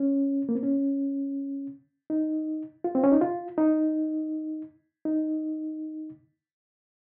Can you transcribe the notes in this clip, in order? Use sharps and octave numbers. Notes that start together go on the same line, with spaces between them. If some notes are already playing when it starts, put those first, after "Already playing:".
Already playing: C#4
A#3
C4
C#4
D#4
F4
C4
C#4
D#4
F4
D#4
D#4